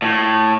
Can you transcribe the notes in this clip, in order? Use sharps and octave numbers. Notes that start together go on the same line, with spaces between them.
A2